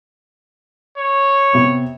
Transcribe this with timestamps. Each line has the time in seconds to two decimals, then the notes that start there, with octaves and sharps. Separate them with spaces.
0.98 C#5
1.53 C3 B3